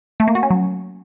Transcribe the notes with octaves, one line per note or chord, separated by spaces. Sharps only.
A3
A#3
F#4
C#4
F#3